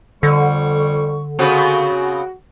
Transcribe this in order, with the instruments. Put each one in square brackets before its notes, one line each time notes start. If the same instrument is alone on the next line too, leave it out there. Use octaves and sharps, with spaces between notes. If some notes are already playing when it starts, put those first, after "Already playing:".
[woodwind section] F2 G3 C#6 [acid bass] D3
[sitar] C#3 B3 C4 [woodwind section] F#4